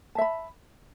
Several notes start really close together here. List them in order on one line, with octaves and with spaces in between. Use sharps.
A5 E5 B5